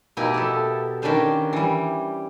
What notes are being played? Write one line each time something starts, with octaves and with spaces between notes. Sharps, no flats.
B2 A#3 D#4 E4 G4 G#5
B3 E4 A4
D#3 C#4 D4 B4 C5 F5
E3 G3